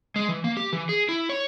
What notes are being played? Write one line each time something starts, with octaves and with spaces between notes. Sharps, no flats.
G#3
E3
A#3
G4
E3
G#4
E4
C#5